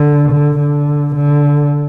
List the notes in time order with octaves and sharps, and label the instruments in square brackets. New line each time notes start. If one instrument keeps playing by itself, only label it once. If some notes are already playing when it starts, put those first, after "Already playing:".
Already playing: [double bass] D3
D3
D3
D3